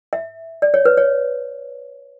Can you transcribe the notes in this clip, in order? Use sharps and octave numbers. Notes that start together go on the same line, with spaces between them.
E5
D5
C#5
B4
C#5